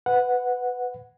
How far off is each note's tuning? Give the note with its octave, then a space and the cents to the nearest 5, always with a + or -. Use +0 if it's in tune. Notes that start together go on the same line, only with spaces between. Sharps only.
B4 +15 F#5 -10